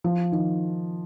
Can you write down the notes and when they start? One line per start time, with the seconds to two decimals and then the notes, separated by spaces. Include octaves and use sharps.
0.04 F3
0.32 D#3